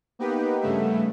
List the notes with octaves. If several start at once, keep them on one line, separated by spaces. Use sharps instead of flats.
A#3 B3 D#4 G4 B4
G2 C#3 A3 B3 E5